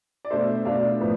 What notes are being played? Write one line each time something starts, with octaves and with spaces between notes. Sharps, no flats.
D5
B2 A3 D4 C5 E5
B2 A3 D4 D5 F5
A2 F3 B3